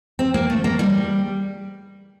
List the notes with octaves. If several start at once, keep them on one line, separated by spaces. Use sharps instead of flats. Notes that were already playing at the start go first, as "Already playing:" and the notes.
C4
A#3
A3
A#3
G3